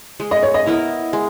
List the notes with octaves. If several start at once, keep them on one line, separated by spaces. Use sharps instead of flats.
G#3
D#5
C#5
D#5
B3 E4 A#4
G#3